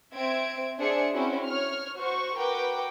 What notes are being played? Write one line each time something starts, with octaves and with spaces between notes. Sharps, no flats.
C4 E5 G#6 D7
D4 G#4 C5 E5 C#7
C4 C#4 E4 F#4
C#5 F6
F#4 C5 C#6
F#4 A#4 B4 G5 D6